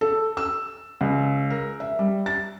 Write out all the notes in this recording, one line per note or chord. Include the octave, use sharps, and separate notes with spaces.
A4
E6
C#2
A#4
E5
G3
A6